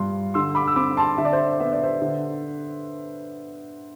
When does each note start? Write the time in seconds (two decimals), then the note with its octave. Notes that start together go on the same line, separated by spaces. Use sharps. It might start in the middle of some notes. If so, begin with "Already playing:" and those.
Already playing: G2 F3 C6
0.34 D3 C6 E6
0.55 B5 D6
0.67 E6
0.76 C4 B5 D6
0.97 A5 C6
1.18 D3 E5
1.25 D5
1.33 C5 E5
1.60 B3 E5
1.72 D5
1.83 C5 E5
2.02 D3